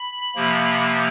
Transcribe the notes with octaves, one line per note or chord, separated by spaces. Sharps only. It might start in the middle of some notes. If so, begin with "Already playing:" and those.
Already playing: B5
C3 F3 A#3